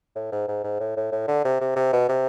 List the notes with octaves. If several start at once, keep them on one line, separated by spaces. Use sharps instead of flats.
A2
G#2
G#2
G#2
A2
A2
A2
D3
C3
C3
C3
B2
C3